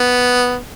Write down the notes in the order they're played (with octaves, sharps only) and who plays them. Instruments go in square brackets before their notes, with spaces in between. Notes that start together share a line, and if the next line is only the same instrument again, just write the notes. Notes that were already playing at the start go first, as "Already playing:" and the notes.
Already playing: [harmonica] B3